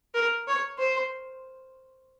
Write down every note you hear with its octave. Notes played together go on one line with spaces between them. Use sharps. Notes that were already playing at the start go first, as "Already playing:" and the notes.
A#4
C#5
C5